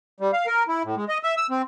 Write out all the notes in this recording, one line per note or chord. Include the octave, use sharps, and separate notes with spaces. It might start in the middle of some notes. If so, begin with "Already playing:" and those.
G3
F5
A#4
E4
A2
G#3
D#5
E5
E6
C4